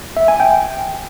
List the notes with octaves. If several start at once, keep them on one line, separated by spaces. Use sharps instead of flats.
E5
G#5
G5